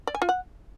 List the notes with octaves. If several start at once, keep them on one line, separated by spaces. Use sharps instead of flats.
D5
G#5
F4
F#5